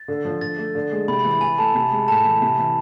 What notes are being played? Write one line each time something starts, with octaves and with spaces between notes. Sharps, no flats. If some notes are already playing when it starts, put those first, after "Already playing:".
Already playing: A6
D3
F3
D3 A6
A3
D3
G#3
C3 B5
B5
E3
B5
E3 G#5
A3 A5
C3
G#3
A2 A5
E3
C3
E3